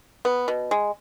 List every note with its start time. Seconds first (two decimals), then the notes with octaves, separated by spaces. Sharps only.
0.25 B3
0.48 B2
0.71 G#3